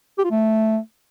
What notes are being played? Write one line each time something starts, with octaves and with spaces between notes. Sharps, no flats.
G4
F4
A3